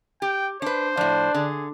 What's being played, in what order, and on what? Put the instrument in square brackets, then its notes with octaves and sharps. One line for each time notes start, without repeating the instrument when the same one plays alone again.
[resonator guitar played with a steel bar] G4 [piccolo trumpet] G5
[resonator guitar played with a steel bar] D4 B4 [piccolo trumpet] C5
[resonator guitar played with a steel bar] A2 F3 [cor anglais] D4
[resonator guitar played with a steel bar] D3 [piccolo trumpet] G#4